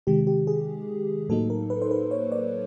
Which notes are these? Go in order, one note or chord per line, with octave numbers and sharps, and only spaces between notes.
C3 D#3 G#3 G4
G4
G#4
A2 F#3 A#3 D#4 A4
A#4
B4
C5
B4
C#5
D5